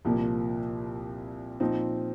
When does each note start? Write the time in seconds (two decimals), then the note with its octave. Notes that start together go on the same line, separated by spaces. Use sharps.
0.05 C2 A#2 F3 A#3
1.60 A#2 F3 C4 D#4